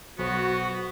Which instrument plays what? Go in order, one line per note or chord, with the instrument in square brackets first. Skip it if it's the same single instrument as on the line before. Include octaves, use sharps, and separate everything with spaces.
[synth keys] B1 [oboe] B3 [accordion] F#4 [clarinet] C5